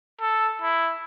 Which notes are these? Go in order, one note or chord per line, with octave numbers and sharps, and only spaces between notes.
A4
E4